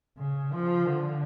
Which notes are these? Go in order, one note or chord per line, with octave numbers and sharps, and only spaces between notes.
C#3
F3
D3